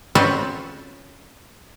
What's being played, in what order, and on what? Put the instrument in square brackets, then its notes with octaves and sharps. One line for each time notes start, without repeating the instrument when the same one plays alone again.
[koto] C4 C#4 F4 F#4 A4 B4